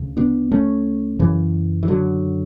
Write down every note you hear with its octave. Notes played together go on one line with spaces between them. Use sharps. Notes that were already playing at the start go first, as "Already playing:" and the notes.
Already playing: D2 C#3
B3 D4
A3 C#4
F#2 C#3 E3
E3
D3 F#3